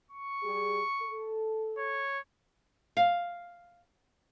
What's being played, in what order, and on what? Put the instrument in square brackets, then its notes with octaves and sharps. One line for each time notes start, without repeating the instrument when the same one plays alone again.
[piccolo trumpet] C#6
[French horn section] G3 G4 G#4
A4
[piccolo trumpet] C#5
[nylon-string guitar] F5